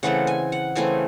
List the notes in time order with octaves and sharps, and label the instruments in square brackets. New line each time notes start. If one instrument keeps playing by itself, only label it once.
[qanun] C#3 E3 A3 C4 F#5
G#5
F#5
C#3 E3 A3 C4 G#5